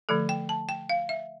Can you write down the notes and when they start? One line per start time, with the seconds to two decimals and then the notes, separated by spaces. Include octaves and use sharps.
0.09 D3 F3 A3 A4
0.29 G5
0.49 A5
0.69 G5
0.90 F5
1.09 E5